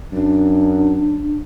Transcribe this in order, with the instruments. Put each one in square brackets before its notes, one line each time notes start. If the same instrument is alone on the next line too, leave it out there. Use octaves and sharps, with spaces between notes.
[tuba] F#2 [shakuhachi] D4